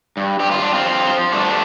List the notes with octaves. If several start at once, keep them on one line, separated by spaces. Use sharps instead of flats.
G2
G2 G4
F4
G2 D4
C4 F4
F3
F3
G2 A3 D4